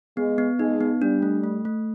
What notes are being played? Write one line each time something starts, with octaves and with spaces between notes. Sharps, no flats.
G#3 B3
B3
G#3 D#4
B3
G3 D4
A3
A3
A3